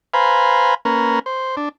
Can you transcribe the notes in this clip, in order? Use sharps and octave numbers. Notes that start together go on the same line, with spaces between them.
B4 C5 F5 G#5 A#5 B5
A#3 C#4 A#4 B4
C5
D4